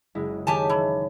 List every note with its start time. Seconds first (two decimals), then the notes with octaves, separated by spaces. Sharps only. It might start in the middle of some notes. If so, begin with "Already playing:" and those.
0.15 F#1 G#3 E4
0.47 D#3 G4 C#5 D#5 G#5 A5
0.70 E3